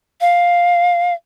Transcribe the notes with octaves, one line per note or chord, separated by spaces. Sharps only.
F5